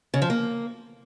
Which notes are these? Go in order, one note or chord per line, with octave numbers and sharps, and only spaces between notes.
C#3
F3
A#3